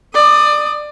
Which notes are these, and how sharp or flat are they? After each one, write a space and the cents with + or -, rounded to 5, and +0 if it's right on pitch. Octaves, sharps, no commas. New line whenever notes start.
D5 +20 D#6 +0